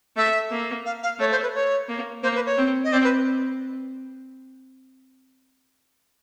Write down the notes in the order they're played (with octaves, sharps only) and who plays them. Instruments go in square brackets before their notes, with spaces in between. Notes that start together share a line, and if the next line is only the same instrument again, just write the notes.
[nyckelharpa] A3 [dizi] E5
[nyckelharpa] A#3
[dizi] F5
F5
[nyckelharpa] A3 [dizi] C#5
[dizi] C5
B4
C#5
[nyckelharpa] A#3
[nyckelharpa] A#3 [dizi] C5
[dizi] B4
C#5
[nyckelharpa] C4
[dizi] D#5
[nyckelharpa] C4 [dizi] D5
[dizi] B4